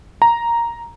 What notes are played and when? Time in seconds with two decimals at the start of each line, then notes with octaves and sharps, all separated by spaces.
0.22 A#5